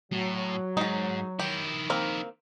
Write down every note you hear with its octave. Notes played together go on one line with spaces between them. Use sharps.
A2 F#3
G#2 D#4 G#4
D#3 E4 G4
A#3 C4 A#4